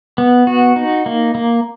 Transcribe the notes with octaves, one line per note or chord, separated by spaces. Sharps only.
B3
F#4
D#4
A#3
A#3